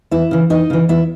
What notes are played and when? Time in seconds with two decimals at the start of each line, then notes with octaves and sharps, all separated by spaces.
0.11 E2 E4 E5
0.31 C#3 E3
0.50 E2 D#4 D#5
0.70 C#3 E3
0.89 E2 E4 E5